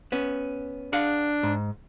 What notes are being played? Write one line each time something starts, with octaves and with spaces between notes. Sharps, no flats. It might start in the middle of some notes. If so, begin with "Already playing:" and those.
B3 C#4
D4 G#4 F5 F#5
G#2